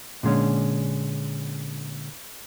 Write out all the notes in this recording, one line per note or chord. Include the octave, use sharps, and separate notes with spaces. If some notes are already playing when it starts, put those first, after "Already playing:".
A#2 D3 G#3 C#4